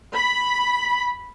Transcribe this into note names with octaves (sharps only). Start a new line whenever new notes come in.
B5